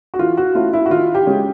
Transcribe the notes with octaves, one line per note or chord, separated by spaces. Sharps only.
F#4
E3 F4
F#4
A3 C#4 E4 F4
E4
F#4
D#3 F4
G4
G#3 C#4